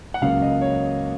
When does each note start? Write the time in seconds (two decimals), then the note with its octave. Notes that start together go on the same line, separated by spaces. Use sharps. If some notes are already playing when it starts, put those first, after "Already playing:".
0.14 F#5
0.22 C#2 C#3 F#3 A#3 C#4 F5
0.42 D#5
0.61 C#5